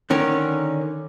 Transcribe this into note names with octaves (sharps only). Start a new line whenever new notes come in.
D3 D#3 C#4 A#4